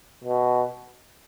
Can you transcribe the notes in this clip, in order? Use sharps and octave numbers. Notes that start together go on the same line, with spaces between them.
B2